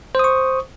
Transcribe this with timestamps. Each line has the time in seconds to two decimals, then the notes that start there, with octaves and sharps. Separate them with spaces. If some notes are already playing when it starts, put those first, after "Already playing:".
0.15 C5
0.19 D#6
0.24 C#6